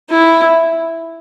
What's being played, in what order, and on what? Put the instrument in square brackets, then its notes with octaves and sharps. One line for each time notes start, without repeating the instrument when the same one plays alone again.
[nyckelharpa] E4